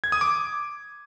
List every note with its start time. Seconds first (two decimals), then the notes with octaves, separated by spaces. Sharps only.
0.04 G#6
0.12 D#6
0.21 D6